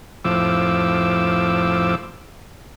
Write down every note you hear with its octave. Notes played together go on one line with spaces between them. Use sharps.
F2 A2 F3 D6 E6